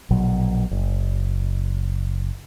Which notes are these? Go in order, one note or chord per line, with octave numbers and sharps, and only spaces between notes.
A#1 B2 F#3
F#1